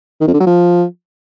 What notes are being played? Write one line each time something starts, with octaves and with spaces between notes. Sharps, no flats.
D#3
F2
D3
F#3
F3